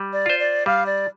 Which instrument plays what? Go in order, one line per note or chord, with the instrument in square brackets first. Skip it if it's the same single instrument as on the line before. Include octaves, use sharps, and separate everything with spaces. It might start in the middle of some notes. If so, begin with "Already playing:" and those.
Already playing: [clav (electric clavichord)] G3
[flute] D5
[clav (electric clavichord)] F4 C5
[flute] D5
[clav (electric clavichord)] G3 [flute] F5
[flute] D5